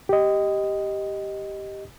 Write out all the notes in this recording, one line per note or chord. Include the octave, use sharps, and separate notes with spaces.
G4 D#5